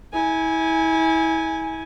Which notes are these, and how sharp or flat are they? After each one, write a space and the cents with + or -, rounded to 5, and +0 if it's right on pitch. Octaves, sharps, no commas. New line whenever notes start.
E4 -30 G#5 +0